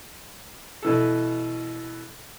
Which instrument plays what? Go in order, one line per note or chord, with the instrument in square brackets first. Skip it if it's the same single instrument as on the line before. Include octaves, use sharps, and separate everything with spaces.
[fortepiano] B2 E3 A4